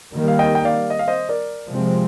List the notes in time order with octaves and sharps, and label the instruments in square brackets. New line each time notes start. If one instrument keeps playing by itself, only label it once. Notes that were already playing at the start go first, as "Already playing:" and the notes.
[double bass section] D#3 G3 A#3
[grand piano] F5
D#5 G5
G5
D5 F5
D#5
F5
C5 D#5
A#4 D5
[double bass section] C3 F3 G#3 C4